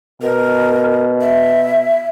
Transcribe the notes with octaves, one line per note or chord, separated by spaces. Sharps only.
B2 A#4
E5